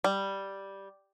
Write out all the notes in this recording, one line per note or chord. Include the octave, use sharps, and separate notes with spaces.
G3